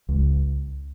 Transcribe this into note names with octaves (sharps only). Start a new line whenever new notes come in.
C#2